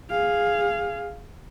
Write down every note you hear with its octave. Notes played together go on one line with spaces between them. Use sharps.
G#4 F5